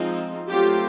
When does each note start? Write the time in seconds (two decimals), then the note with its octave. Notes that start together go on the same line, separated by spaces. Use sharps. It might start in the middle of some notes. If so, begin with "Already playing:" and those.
Already playing: F3 G#3 C4 D#4
0.47 F#3 A3 C4 F4 G4